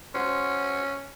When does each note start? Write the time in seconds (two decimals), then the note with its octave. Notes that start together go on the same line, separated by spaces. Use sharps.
0.14 C#4 F#4 C5